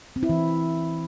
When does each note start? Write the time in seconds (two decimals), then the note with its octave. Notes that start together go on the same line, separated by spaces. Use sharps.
0.16 C4
0.23 E4
0.29 E3